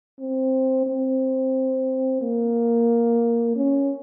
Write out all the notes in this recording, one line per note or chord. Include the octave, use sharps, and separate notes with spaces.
C4
C4
A#3
C#4